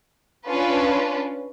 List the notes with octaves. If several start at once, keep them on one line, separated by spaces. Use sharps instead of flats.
C#4 D4 F4 B4